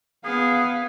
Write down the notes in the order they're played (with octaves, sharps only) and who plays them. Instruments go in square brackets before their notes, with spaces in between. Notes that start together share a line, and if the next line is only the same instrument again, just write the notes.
[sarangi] B3 [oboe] G#4 [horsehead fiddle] F5